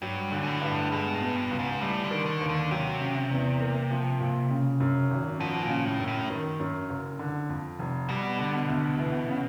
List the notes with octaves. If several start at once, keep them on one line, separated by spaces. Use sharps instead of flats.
G2 F#3
D3
G#2
A2
G2
B2 G#3
A2
B2
G2
C#2
G#2
A2 G3
D3
D#3
D3
D#2
D3
C3 F#3
C#3
E2
A#3
F3
A#2
C#3
F#2
G#1
B2 F3
A#2
C#3
A2
F#2
A2
D#3
F#2
F#1
D3
F2
F1
B2 G3
D3
D2
E3
C#3